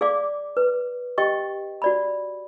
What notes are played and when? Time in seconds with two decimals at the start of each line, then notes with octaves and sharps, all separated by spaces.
0.01 G#4 D5 F5 D6
0.57 B4
1.18 G4 D#5 G5 C#6
1.82 F#4 D5 B5